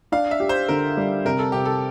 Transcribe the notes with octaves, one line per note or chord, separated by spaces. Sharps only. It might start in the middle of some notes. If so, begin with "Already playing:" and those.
D4 F5
E5
G4
C5
D3 A#4
G3
C3 A#4
A4
C3 G4
A4